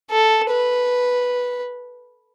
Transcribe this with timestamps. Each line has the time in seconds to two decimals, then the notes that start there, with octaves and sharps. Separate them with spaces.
0.10 A4
0.51 B4